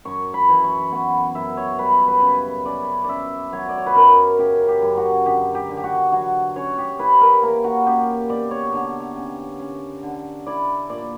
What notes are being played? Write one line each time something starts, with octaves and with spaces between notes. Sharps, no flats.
F#2 C#6
B5
E3
C#6
B3 C#6
F#2 E5
C#5
G3 B4
B4
C#3
C#4 D5
C#4 D5 E5
F#3 C#5
D5
C#5
B4
F#2 A#4
C#3 G4
G4
F#2
F#4
D3 G4
G4
D3
G4
F#4
F#3 F#4
C#4 C#5
G4
E4 B4
A#4
A#3 A#4
F#4
C#4 G4
B2 D5
C#5
D3
C#4
C#4
D3
E4 D5
A#2 D5